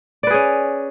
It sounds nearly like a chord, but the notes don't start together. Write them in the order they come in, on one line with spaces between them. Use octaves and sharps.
D5 B4 G#4 C#4